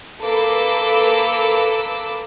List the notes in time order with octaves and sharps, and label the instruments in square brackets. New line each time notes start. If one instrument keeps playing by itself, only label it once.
[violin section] A#3 A4 B4 B5 D6 E6